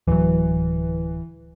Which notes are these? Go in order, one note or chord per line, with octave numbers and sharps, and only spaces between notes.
D1 E3 F#3